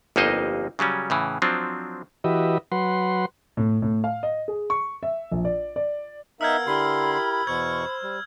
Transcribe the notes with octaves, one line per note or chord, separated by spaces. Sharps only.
G1 F2 A#3 D#4 C5 D#5
C#3 F#3 G3 C#4
A2 C#3 E3
F3 F#3 C4 D4
E3 F#4 G4 B4 D#5 E5
F#3 B4 F#5 C6
A2
A2
F5
D#5
G#4
C#6
E5
A#1
D5
D5
B3 D#4 A#4 E5 F5 E6 F6 G#6
D3 E4 G4 A#4 B5 C6
E2 B2 C5 C#6 G#6
G3